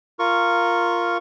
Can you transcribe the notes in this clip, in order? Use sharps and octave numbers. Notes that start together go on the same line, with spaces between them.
F4 A#4 C#6